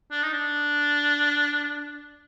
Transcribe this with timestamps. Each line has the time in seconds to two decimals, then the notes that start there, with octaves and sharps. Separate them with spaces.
0.11 D4
0.23 D#4
0.33 D4